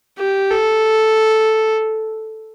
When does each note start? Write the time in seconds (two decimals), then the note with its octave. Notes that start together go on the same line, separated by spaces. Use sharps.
0.18 G4
0.51 A4